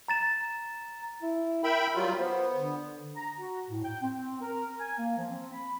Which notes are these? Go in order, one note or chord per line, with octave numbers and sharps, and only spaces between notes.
A#5 A6 E7
E4
A#4 E5 G5 B5
F#3 G3 F4
B3 C5
D3
A#5
F#4
A2
G5
C4
A#4
G#5
A#3
F3
C4
B5